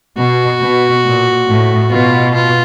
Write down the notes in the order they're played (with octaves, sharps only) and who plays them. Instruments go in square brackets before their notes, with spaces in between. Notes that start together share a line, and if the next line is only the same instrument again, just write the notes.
[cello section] B2 [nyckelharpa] F#4
[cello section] B2
A#2
A2
[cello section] B2 [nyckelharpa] F4
[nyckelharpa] F4